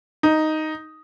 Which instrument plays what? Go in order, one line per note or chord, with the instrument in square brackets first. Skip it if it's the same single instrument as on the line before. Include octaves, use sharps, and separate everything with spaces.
[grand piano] D#4